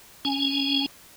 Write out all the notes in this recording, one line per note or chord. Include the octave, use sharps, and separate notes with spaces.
C#4 G#5